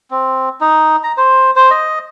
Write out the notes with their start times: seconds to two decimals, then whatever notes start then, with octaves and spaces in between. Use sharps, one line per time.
0.11 C4
0.61 D#4
1.03 A#5
1.17 C5
1.56 C5
1.71 D#5